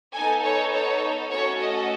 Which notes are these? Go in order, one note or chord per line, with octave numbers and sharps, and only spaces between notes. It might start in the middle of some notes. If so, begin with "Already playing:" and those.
B3 D#4 A4 G#5
C#5
C#5
A3 C#4 F#4 A4 C#5
D#5